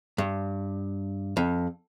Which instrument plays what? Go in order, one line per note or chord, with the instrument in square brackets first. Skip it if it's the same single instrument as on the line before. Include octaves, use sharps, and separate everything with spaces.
[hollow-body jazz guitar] G2
F2